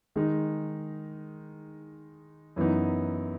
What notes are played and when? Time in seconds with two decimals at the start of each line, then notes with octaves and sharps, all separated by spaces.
0.16 D#3 G#3 D#4
2.56 F#2 E3 B3 D#4